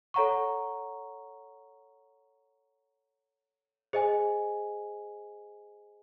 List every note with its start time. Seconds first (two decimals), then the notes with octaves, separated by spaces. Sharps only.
0.14 A4 C#5 F#5 A#5 C#6
3.93 G#4 C5 D#5 G#5